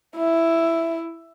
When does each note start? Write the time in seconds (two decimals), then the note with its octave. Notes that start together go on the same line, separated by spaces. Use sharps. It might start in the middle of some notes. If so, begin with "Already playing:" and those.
0.16 E4 E5